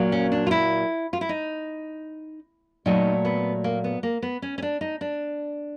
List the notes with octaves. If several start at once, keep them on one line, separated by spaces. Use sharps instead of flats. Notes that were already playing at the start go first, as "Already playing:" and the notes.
Already playing: A#2 F#3 A#3
C#4
D4
F4
E4
F4
E4
D#4
A#2 F#3 A3 D#4
B3
A#3
B3
A#3
B3
C#4
C#4
D4
D#4
D4